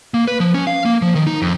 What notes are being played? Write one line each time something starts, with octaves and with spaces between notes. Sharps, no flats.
A#3
B4
F3
C#4
F5
A#3
F3
D#3
D#4
F2